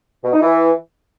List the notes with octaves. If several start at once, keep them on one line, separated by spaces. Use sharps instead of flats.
B2
D#4
E3